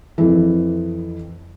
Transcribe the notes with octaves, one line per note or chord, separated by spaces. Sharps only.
F2 E3